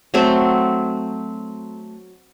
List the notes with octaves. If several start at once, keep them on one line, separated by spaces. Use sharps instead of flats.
F#3 A3 C4 A4